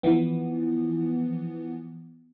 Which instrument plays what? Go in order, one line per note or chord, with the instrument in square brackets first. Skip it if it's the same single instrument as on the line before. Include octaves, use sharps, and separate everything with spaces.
[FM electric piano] E3 F3 B3